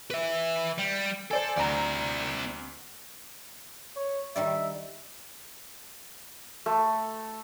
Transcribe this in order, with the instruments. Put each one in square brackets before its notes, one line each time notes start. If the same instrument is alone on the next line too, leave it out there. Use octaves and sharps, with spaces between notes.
[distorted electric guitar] B4 E5
G3
[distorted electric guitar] A4 [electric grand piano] C5 D5 G#5
[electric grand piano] D2 A#5 [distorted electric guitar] C4 D5
[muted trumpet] C#5
[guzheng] D#3 G3 D5 [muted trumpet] E5
[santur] A3